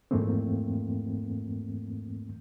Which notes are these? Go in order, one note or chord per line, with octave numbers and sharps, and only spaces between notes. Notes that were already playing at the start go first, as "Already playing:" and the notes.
F2 G#2 E3 A3 A#3 C4